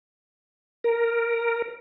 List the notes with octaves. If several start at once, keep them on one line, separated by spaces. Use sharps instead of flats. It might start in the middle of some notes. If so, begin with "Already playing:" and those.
A#4